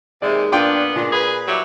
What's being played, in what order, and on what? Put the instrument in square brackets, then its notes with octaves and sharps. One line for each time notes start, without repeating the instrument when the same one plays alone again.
[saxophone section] D#2 E3 G#3 [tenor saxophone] C3 [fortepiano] D5
[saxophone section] A#2 [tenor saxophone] B3 [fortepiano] D4 F4 G5
[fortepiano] A#2 [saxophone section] G#3 D4
[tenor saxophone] G#4 [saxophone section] B4
[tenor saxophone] F#3 [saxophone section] G3 E4 G4